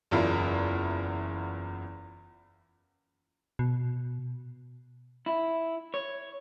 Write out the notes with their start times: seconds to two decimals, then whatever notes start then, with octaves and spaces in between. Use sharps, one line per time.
0.11 F#1 E2 E4 F4
3.59 B2
5.26 E4
5.94 C#5